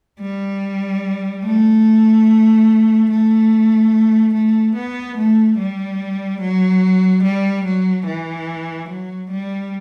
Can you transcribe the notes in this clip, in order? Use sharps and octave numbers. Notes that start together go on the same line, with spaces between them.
G3
A3
A3
A3
B3
A3
G3
F#3
G3
F#3
E3
F#3
G3